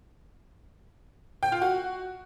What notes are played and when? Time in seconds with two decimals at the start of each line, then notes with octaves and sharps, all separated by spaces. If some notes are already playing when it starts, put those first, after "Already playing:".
1.43 G5
1.52 F4
1.61 F#4